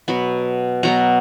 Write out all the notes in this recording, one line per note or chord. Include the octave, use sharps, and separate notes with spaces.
B2 F#3 B3 B5
B2 F#3 B3 A#5